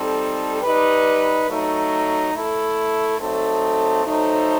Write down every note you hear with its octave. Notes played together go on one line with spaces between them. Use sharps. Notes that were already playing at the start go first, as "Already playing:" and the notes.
Already playing: G3 C4 D#4 A4
G3 D#4 G4 B4
F#3 A3 D#4
A3 E4 A4
F#3 A3 C4 D#4 A4
F#3 A3 D#4 A4 C5